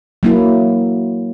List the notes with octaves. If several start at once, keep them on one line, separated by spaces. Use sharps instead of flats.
F#3 A#3 E4